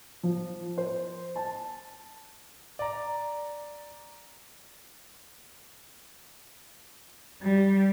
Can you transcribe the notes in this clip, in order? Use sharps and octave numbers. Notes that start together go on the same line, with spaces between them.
F3
C5
A5
D5 A#5
G3